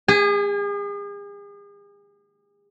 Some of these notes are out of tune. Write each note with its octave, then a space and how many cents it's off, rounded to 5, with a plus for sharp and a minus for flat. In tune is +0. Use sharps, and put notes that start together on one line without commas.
G#4 -40 G#5 +0